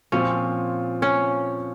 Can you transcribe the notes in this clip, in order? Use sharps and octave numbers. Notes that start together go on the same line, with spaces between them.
A#2 F3 C4 C#4
C#4